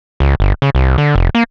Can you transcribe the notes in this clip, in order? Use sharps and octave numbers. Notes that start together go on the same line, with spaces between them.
C#2
G1
C#3
C2
D3
F1
A#3